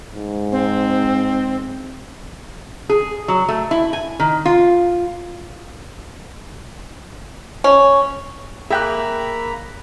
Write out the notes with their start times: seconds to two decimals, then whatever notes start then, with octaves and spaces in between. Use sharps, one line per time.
0.15 G#2
0.52 C4
2.89 G#4
3.28 F#3
3.49 A3
3.71 E4
3.93 G#5
4.20 D#3
4.46 F4
7.64 C#4
8.71 A#3 G#4 E5 G5 A#5 B5 F#6